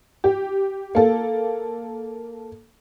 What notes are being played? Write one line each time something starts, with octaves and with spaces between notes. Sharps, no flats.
G4
A#3 A4